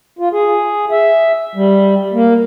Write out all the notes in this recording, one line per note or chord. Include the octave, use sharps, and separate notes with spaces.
F4
G#4
E5
G3
A#3